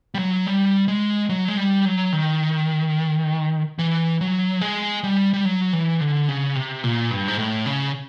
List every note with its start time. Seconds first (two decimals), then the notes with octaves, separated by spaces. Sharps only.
0.15 G3
0.19 F#3
0.46 G3
0.88 G#3
1.29 F#3
1.48 G#3
1.57 G3
1.85 F#3
2.13 D#3
3.79 E3
4.21 F#3
4.61 G#3
5.04 G3
5.34 G3
5.45 F#3
5.73 E3
6.01 D3
6.28 C#3
6.55 C3
6.84 A#2
7.11 G2
7.28 G#2
7.38 A2
7.66 C#3